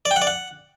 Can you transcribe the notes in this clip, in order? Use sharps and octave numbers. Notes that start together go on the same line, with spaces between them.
D5
G5
F#5
D5
F#5